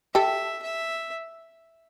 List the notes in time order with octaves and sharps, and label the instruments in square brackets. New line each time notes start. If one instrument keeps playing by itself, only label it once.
[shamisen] G4 A4 [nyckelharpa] E5
[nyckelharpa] E5